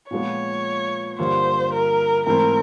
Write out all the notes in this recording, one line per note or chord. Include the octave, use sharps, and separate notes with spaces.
A#2 F3 G#3 B3 C#5
G2 D3 F3 A#3 C5
A#4
G#2 E3 A3 C4 E4 A#4